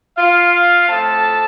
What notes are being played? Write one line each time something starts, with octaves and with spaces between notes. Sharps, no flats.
F4 F5
A2 F3 A3 C4 A4 A5